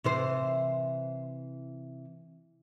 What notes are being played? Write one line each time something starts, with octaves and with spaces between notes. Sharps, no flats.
C3 E3 C5